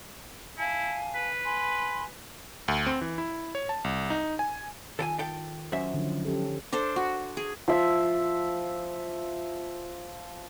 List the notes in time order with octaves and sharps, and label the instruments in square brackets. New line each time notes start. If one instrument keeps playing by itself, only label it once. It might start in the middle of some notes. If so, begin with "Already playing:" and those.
[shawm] E4 [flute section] F5 G#5 A5
[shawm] B4
[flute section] G#5 B5 C6
[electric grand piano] D2
C4
E3
E4
C#5
A5
C2
D#4
G#5
[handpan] D#3 F4 [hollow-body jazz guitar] A4 G5 G#5
[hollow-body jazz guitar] A4 G5
[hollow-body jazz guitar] F#2 E5 [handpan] C#4 C5
[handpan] D3 F3 D#4
C#4 G4 A4
[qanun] D4 A4 C5
F#4
G#4
[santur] F3 E5